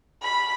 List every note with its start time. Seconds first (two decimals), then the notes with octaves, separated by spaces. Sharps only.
0.22 B5